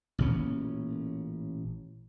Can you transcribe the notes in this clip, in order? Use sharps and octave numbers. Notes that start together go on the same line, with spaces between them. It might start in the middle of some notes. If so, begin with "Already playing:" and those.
A1 A#2 C#4